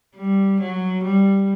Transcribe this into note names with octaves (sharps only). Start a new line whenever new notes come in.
G3
F#3
G3